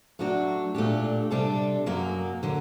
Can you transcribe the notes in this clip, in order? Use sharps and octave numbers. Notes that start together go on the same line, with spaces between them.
F#3 A3 D4 F#4
A#2 A3 D4 G4
C3 G3 D4 A4
F#2 F#3 A#3
D3 F#3